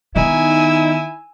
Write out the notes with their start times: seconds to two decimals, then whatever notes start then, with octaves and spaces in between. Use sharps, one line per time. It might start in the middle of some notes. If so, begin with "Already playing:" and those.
0.16 D#3 B3 D#4 E4 G#5 E6